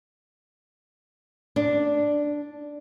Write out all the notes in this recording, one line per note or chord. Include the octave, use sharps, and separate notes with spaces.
D4